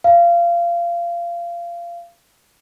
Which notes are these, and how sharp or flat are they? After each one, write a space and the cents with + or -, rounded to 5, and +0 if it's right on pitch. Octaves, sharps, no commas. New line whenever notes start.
F5 -25